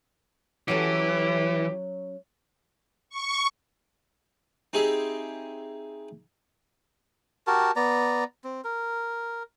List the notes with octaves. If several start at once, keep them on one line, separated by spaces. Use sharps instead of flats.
E3 F#3 C#4 G4 A4
C#6
C4 D#4 E4 G4 G#4
F#4 G4 A#4 A5
B3 D5 A#5
C4
A#4